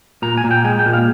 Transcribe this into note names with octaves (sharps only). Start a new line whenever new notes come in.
A#2 A#5
G#5
A#2
G5
G#3 G#5
G5
A#2
F5